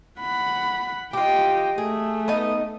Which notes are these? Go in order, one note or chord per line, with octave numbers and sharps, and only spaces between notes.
F#5 B5
F4 G4 D#5 G5
A3 G#4
B3 D#4 D#5